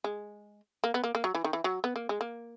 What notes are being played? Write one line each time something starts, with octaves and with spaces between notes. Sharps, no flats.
G#3
A#3
B3
A#3
A#3
F#3
E3
D#3
E3
F#3
B3
A#3
G#3
A#3